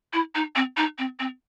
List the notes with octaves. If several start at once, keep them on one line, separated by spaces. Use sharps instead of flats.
E4
D#4
C4
D#4
C4
C4